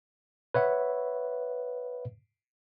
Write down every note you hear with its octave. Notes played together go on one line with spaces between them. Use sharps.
B4 C#5 E5 F#5